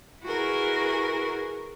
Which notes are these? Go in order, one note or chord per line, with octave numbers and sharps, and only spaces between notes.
E4 F#4 G#4 A#4 B4